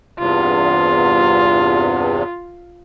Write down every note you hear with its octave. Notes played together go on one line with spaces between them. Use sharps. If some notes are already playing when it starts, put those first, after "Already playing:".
E2 G2 C3 F4